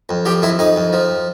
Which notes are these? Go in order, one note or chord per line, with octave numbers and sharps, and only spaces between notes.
F2
F3 G4
F2 E4
F2 D#4
F2
F3